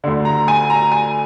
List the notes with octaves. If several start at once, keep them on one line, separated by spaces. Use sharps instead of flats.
D2 D3
A#5
G#5
A#5
G#5